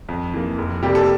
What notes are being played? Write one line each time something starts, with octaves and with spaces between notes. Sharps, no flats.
F2
E3 A#3
F1
F2 C3 G3 A#3 G4
A4